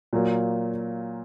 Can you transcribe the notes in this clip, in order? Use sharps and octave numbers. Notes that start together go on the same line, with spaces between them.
A#2 F#3 A#3